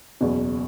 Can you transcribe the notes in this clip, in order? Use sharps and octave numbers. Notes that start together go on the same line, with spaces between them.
F#1 E2 B2